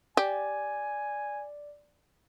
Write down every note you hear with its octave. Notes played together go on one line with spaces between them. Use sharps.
G4 D5 G#5